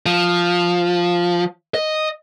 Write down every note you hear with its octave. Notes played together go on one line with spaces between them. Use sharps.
F3
D#5